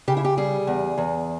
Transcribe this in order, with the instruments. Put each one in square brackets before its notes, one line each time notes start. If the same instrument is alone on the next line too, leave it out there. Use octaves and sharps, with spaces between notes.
[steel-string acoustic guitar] C#3 G4
E4
G4
G3 G#4
E2
E2